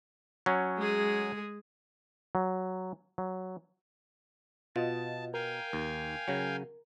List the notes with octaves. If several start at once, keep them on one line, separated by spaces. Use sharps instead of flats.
F#3 C#4
G#3 G#4
F#3
F#3
B2 F4 D#5 A5
A#4 F5 G5 G#5
D#2
C#3 F#3